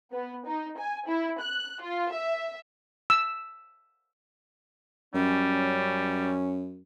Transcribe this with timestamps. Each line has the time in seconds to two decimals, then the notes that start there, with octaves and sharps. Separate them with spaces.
0.12 B3
0.46 D#4
0.78 G#5
1.08 E4
1.41 F#6
1.82 F4
2.12 E5
3.10 E6
5.15 F#2 G3 C#4